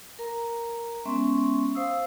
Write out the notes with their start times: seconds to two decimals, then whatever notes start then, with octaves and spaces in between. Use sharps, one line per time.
0.19 A#4 A#5
1.05 G#3 B3 C#4 E5 C6 C#6
1.75 C5 F5 D#6 E6